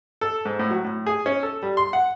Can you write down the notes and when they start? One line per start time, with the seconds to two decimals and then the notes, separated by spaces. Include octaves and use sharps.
0.21 A4
0.45 G#2
0.59 A2
0.70 F#3
0.84 A2
1.06 G#4
1.26 C#4
1.43 A4
1.63 G3
1.77 C6
1.93 F#5